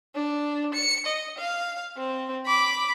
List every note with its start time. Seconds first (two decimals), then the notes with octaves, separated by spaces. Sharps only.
0.15 D4
0.74 C#7
1.06 D#5
1.38 F5
1.97 C4
2.46 B5 D6